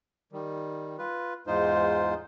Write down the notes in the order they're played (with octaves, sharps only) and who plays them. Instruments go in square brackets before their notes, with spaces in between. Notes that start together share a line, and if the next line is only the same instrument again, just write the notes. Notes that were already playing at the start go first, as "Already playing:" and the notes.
[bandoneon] D#3 G3
F4 B4
E2 G#2 G#3 D#4 F4 C5